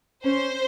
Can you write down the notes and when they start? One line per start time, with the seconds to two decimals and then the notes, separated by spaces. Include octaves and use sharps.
0.24 C#4 C5